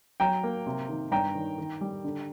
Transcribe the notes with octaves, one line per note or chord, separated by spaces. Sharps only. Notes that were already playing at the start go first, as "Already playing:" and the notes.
F#3 G5 A#5
A#3
C3
D#3
G2 G5 A#5
D#3
D#3
G3
D3